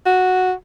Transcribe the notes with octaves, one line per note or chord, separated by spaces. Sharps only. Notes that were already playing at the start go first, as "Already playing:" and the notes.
F#4